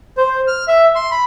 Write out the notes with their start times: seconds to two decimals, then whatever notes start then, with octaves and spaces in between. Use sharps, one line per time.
0.18 C5
0.48 F6
0.68 E5
0.96 C6
1.11 B5